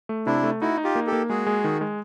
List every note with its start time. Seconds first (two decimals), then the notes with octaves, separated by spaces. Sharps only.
0.09 A3
0.26 C3 D4 E4
0.44 A3
0.61 D#4 E4 F#4
0.78 D#4
0.84 F4 G4
0.95 A#3
1.07 G4 A4
1.12 A#3
1.29 G#3 F#4 G#4
1.47 G#3
1.64 D#3
1.81 G#3